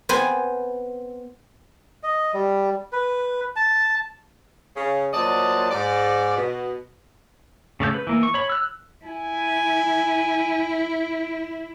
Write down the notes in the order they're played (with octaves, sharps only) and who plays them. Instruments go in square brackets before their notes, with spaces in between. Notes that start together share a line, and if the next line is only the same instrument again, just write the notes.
[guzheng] B3 C4 B4 C5 G#5
[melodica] D#5
G3
B4
A5
[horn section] C#3
A#2 F#3 C5 D5 D#5 A5
G#2 D5
B2
[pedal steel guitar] C#3 A3 D5 G6
B4
E3 A#3
C#6
C#5 B5
E6 F#6
[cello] E4 [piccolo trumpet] G#5